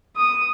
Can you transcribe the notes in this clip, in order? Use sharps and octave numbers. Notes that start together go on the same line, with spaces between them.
D#6